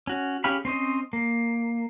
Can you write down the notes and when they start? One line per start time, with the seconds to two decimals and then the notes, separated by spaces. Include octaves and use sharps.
0.07 C#4 F#4
0.44 C#4 G4 G#4 F5 B5
0.65 C4 C#4 C5 D#5
1.13 A#3